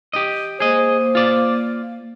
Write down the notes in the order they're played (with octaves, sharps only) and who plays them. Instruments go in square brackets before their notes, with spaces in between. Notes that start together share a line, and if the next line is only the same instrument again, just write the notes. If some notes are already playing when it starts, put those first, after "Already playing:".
[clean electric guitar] G4 D#5
[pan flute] A#3 [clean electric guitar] G#4 D#5 [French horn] C5
[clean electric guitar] F4 D5